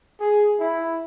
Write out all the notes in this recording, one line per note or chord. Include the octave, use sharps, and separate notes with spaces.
G#4
E4